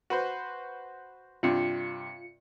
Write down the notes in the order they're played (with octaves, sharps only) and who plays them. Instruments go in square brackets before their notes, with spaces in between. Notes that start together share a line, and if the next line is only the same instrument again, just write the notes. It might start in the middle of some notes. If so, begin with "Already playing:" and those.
[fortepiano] F#4 B4 C5
[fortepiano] G2 C3 [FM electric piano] F4 C#7